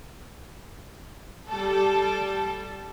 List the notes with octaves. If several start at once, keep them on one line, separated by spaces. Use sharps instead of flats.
G3 A4